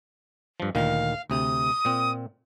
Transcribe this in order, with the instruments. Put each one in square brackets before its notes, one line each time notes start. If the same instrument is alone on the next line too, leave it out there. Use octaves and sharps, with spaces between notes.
[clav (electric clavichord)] G2 F3
[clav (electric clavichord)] D2 A#2 D#3 [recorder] F5
[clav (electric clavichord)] D2 C3 [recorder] D#6
[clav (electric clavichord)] A#2 C4